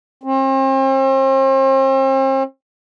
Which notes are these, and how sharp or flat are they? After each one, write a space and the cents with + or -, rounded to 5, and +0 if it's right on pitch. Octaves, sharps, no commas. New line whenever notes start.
C4 +40